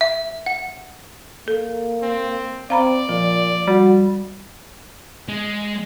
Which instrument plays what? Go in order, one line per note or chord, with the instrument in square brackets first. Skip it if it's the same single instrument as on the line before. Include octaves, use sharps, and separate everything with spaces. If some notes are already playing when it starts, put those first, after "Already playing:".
[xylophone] E5
F#5
[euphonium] A#3 [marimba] A4
[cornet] C4
[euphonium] C4 [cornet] D5 [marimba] F5 A#5 B5
[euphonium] A#2 [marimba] F3
[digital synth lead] G3 [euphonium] F#4
[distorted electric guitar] G#3